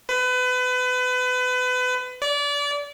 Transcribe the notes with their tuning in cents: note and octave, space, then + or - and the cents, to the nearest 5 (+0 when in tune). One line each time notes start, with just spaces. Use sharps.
B4 +30
D5 -30